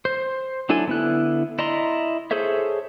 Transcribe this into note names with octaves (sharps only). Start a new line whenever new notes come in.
C5
F#3 D4 E4 A4 G#5
D3 B3 E4 F#6
E4 D5 D#5 A#5 C6
G#4 A4 C5 C#5 E5